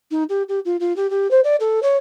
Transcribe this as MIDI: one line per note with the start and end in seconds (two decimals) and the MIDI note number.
0.11 0.24 63
0.29 0.43 67
0.49 0.60 67
0.65 0.77 65
0.80 0.95 65
0.96 1.10 67
1.10 1.30 67
1.31 1.41 72
1.44 1.56 74
1.60 1.80 69
1.83 1.97 73